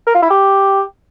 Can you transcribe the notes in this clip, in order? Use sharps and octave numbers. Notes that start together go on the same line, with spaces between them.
A#4
F4
E4
G4